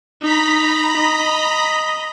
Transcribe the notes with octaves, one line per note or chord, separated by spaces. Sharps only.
D#4 A#5 B5 B6
D#5